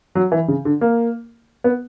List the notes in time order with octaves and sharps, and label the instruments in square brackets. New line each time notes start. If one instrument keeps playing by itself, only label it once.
[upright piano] F#3
E3
C#3
D3
A#3
B3